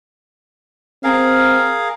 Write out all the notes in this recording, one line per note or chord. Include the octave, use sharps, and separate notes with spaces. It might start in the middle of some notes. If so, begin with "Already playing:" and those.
C4 G#4 A#4 F5